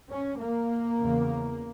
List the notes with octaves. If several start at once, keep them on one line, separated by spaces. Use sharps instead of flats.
C#4
A#3
E2 C#3